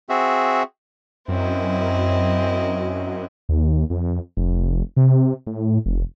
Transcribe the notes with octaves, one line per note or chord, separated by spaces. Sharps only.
C4 F#4 G#4 E5
F#2 C4 E4 D#5
D#2
F2
F1
C3
A2
F1